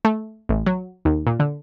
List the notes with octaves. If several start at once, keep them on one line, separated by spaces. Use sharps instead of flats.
A3
A1
F#3
D#2
A#2
D3